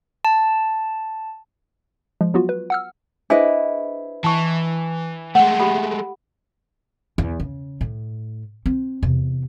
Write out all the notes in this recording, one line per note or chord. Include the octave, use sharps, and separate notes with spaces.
A5
F3 G#3
F#3 B3 F4 F#4
B4
F#5 E6 F6
D4 E4 G#4 B4 C5 D#5
E3 A5 C#6
G#3 A3 F#5
G4 A4 B5
E2
C#3
A2
C4
E2 C3